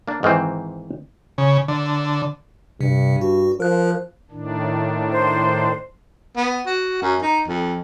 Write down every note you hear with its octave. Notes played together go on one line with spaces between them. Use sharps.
A#3 D4
G#2 D#3 E3 C4
C#3
D3
G2 C3
F#4
F3 A#4 F#6
A2 D#3 D4
C5
B3
F#4
F#2
D#4
F2